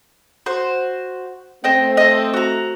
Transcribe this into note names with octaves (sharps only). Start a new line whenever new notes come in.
F#4 C5
A3 C4 C5 D#5 G5
A4 D#5
F#4 A#5